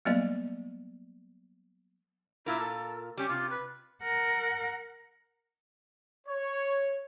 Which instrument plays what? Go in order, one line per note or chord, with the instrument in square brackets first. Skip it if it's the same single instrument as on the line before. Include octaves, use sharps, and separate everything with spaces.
[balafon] F#3 G3 A#3 B3 D5 D#5
[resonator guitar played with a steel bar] A#2 F4 A#4 [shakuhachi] E4
[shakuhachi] A4
[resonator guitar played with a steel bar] G3 C#4 [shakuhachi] G4
[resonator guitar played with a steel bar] C3 [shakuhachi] F4
[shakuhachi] B4
[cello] A#4 F#5
[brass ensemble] C#5